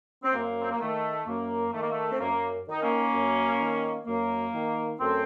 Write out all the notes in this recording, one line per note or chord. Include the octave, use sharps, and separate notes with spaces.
C4
F#2 A#3
C4
A#3
D#3 A3
F#2 A#3
D#3 A3
A#3
A3
C4
F#2 A#3
D#3 D#4
A#3 C#4
F#2
D#3
F#2 A#3
D#3
F#2 A3 C4